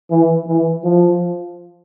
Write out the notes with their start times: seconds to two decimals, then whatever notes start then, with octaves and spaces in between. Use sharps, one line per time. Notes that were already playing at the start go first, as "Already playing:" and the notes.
0.11 E3
0.47 E3
0.84 F3